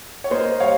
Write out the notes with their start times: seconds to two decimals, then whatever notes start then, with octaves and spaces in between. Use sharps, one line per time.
0.24 C#5
0.30 A#3 C5 D#5
0.60 G3 C#5 F5